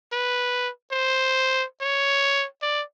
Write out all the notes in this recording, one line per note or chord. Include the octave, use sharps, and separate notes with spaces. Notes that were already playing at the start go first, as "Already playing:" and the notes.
B4
C5
C#5
D5